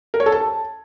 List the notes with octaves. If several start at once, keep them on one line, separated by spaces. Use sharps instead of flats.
A#4
C#5
A4
A5